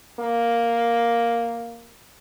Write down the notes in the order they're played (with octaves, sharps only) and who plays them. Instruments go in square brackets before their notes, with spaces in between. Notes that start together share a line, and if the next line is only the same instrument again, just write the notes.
[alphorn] A#3